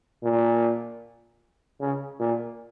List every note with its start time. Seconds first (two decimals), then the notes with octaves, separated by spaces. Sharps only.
0.24 A#2
1.81 C#3
2.20 A#2